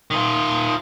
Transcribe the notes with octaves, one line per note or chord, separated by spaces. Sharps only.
D#3 F4